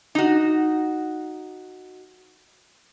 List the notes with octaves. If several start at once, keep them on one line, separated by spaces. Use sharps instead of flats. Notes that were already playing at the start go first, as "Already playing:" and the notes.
D#4 F#4